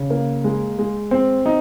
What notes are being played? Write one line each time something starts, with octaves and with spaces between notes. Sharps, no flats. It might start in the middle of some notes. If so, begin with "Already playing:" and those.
Already playing: C#3
A#3
G#3
G#3
C4
D#4